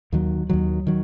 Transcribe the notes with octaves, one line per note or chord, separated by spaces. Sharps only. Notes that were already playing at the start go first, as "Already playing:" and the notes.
D#2 D#3 F#3
D#2 D#3 F#3
D#3 F#3